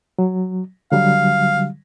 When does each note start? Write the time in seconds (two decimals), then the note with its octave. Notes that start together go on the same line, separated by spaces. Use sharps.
0.19 F#3
0.92 D3 F#3 G3 F5